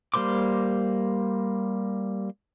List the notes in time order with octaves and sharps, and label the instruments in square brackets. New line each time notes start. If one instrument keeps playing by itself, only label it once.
[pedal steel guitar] G3 A#3 C5 C6 D6